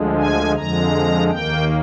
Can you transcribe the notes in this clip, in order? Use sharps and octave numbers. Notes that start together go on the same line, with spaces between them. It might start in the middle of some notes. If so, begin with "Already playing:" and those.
Already playing: D2 D3 F3 G#3
G#5
F2 D3 F3 G#3 A#5
D#2 D#3 A#3 G5